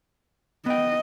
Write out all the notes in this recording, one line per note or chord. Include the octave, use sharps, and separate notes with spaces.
B3 D#5 G5